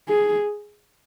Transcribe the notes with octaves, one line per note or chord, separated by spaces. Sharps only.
G#4